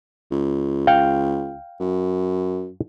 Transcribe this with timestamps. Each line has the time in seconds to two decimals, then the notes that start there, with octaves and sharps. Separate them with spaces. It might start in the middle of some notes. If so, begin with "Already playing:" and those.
0.31 C#2
0.87 F5 G5
1.80 F#2